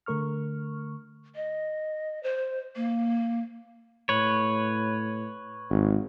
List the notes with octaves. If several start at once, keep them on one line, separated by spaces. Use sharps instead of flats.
D3 A3 A#4 C#6 F6
D#5
C5
A#3
A2 B4 C#5
G#1